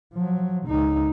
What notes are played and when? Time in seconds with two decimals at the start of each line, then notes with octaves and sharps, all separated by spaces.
0.14 F3 F#3
0.67 C#2 D#4